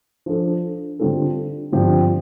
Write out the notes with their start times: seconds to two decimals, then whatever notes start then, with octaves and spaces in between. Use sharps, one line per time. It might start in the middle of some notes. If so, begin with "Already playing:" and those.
0.26 F3 D4 A4
0.99 D3 G3 C4 F4 A4
1.72 G2 D3 F3 C4 G4